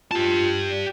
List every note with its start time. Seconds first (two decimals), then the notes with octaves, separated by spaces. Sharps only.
0.11 F4 G4 A5
0.71 D5